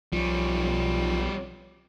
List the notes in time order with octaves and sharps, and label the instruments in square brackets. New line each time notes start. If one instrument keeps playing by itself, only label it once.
[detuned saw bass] B1 [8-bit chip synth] F3 F4 [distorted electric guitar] G3 C#4